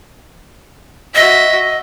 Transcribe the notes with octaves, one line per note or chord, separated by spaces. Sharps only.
F#4 D#5 E5